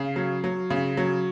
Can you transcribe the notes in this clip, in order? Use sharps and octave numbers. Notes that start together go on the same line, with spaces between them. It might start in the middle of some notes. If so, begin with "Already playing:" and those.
Already playing: C#3 F5
F#3
F#3
C#3
F#3